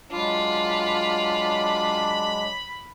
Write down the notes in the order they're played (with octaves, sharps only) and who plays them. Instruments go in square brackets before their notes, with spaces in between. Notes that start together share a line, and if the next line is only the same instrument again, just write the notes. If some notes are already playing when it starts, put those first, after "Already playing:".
[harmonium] F#3 G#3 [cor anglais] D4 [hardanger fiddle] F4 [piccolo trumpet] B5